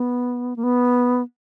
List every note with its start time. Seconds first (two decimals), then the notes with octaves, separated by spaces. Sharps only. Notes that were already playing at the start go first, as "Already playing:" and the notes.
Already playing: B3
0.56 A#3
0.63 B3